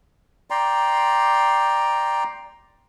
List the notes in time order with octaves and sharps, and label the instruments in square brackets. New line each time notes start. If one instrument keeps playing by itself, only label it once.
[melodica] D5 G5 A#5 C6